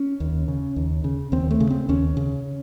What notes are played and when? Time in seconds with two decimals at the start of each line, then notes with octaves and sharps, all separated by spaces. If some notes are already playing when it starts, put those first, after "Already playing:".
Already playing: C#4
0.20 D#2
0.48 C#3
0.76 D#2
1.04 C#3
1.32 D#2 C4
1.51 A3
1.60 C#3
1.70 C4
1.89 D#2 C#4
2.17 C#3